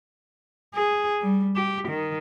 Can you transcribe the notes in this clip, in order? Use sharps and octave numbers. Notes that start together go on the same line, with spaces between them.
G#4
G3
G4
D#3